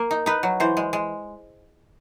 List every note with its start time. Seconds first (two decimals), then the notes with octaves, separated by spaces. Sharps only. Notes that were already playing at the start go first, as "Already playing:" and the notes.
Already playing: A#3
0.11 D#4
0.26 D#4 B4
0.43 F#3
0.60 E3 C5
0.77 G#3
0.93 G#3